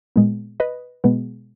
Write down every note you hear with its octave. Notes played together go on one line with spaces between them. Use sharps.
A#2 G#3 B3
B4 D#5
B2 G#3 B3